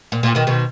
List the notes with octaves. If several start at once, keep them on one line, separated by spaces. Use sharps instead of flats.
A#2
A#2
B2 D#3
B2 D#3